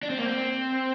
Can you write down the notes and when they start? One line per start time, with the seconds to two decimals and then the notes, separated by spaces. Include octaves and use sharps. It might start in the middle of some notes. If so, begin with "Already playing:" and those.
0.03 D4
0.10 C4
0.18 A#3
0.25 C4